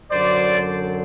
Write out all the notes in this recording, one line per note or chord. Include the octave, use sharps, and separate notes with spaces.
F#2 D3 F#3 C5 D5